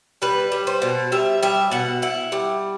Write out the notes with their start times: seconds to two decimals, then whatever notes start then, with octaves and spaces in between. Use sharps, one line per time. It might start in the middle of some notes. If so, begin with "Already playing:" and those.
0.22 G3 B4
0.52 G3
0.67 C5
0.82 B2
1.12 G3 E5
1.43 G3 E5
1.71 B2 F#5
2.02 E4 F#5
2.32 G3